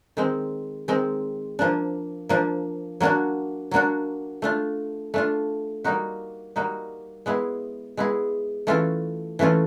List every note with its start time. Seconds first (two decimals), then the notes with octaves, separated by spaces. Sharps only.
0.17 D#3 G#3 C4
0.88 D#3 G#3 C4
1.59 F3 A#3 D4
2.29 F3 A#3 D4
3.00 F#3 A#3 D4 F#4
3.71 F#3 A#3 D4 F#4
4.42 A3 D4 F4
5.14 A3 D4 F4
5.84 G3 A#3 D#4 F#4
6.56 G3 A#3 D#4 F#4
7.26 G#3 B3 E4 G#4
7.97 G#3 B3 E4 G#4
8.67 E3 A3 C#4 F4 A4
9.39 E3 A3 C#4 F4 A4